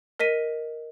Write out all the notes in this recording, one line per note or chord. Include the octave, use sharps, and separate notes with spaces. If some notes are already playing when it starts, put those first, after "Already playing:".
A#4 D#5 B6 D#7